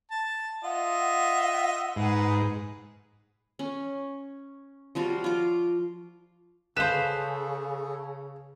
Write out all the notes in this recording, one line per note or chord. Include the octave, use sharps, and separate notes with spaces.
A5
F4 D#5 E5 F#5
G#2 D#4 G#4 B4
C#4
F3 G3 F4 F#4
F4 D6
C#3 G#4 A4 B4 C5 F5 E7